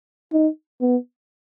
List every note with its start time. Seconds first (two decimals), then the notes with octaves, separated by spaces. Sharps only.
0.33 D#4
0.81 B3